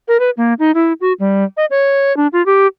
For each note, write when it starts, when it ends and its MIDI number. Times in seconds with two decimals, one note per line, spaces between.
0.08 0.18 70
0.20 0.30 71
0.37 0.54 58
0.59 0.71 63
0.75 0.93 64
1.01 1.13 66
1.20 1.44 55
1.57 1.65 75
1.71 2.15 73
2.17 2.27 62
2.33 2.44 65
2.46 2.67 67